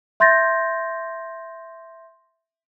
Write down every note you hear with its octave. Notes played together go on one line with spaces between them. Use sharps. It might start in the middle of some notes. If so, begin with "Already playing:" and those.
E5 C6 G6 A6 A#6